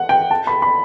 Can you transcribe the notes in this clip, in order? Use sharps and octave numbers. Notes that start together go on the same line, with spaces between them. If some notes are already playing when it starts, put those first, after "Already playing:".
Already playing: F#5
G5
A5
B5
B5